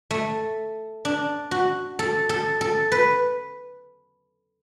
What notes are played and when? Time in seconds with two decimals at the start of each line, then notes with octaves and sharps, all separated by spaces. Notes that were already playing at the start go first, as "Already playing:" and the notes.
0.11 A3
1.05 D4
1.51 F#4
1.99 A4
2.29 A4
2.61 A4
2.92 B4